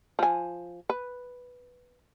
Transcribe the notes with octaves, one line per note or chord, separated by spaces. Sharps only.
F3 G#5
B4